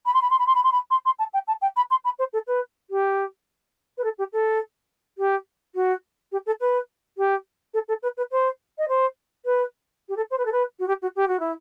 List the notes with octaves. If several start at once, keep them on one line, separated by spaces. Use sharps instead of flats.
B5
C6
B5
C6
B5
C6
B5
C6
B5
C6
C6
A5
G5
A5
G5
B5
C6
B5
C5
A4
B4
G4
B4
A4
G4
A4
G4
F#4
G4
A4
B4
G4
A4
A4
B4
B4
C5
D#5
C5
B4
G4
A4
C5
B4
A4
B4
F#4
G4
F#4
G4
F#4
E4